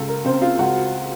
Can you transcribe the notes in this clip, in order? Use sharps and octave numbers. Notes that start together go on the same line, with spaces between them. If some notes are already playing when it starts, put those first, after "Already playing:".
Already playing: C#2 A4
A#4
C#3 C4 C5
F4 F5
C#2 F#4 F#5